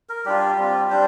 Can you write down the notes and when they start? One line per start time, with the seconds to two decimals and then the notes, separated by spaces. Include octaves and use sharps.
0.09 A#4
0.26 G3 D4 F4 G4
0.58 G3 C4 F4
0.90 G3 D4 C5